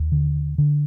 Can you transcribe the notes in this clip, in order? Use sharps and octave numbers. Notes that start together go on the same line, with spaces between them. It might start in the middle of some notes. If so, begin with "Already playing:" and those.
Already playing: D#2
D3
D3